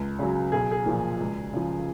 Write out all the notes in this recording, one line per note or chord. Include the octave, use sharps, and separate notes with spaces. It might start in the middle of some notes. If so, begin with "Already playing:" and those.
Already playing: C#2
C#3 F#3
B1 G#4
G#4
A#2 F3
C#2
C#3 F3